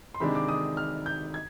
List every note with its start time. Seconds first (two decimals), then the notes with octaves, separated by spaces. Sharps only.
0.14 C6
0.20 C3 D#3 G#3 D4 B5
0.35 D6
0.49 D#6
0.77 F6
1.06 G6
1.34 G#6